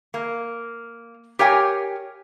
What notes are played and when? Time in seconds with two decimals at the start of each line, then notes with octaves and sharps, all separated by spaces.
0.14 A#3
1.39 G4 A#4 C#5 F5 G5 G#5